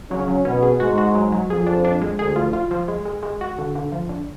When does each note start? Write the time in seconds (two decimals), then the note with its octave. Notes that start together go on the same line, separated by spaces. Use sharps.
0.11 C#3 F#3 C#4
0.28 F#3
0.45 B2 B3 C#4
0.62 G#4
0.80 G#2 G#3 F#4
0.98 F#4
1.15 F#3
1.32 F#3
1.49 F2 F3 G#4
1.67 D4
1.85 D4
2.01 G#3
2.19 D2 D3 G#4
2.36 F3
2.53 F4
2.71 F3
2.88 G#3
3.05 G#3
3.23 G#3
3.41 F#4
3.58 D3
3.75 D3
3.92 F3
4.09 D3